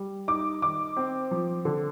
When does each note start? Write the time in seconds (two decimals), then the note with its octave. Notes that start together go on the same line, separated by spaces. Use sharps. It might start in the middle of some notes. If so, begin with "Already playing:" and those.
Already playing: G3
0.28 D#4 D6
0.62 D#3 D6
0.96 C4
1.31 F3
1.65 D3